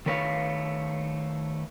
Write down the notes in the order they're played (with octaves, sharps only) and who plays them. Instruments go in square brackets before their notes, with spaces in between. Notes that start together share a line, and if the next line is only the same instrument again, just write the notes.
[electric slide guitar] D#3 A3 B4 C#5 F5